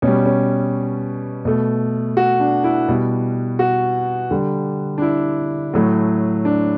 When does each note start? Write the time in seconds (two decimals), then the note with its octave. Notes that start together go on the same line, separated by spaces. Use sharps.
0.02 B2 G3 C#4
0.25 C#4
1.45 B2 A3
2.17 F#4
2.40 D4
2.64 E4
2.88 B2 G3
3.59 F#4
4.31 D3 G3
4.98 D4
5.02 E4
5.73 A2 F#3 A3
6.45 D4